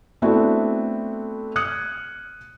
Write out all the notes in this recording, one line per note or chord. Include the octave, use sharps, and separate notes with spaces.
A3 B3 C4 D4 E4 F#4
D#6 F6 F#6 G#6 C#7